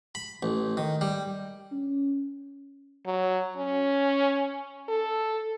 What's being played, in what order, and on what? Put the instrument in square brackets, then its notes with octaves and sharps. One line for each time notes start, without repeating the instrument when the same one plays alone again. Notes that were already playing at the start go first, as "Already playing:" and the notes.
[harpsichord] B5
A1
D#3
G3
[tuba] C#4
[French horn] F#3
C#4
A4